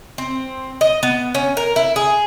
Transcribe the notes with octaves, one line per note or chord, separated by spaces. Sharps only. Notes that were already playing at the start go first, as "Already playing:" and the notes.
C4
D#5
B3
C#4
A#4
E4
G#4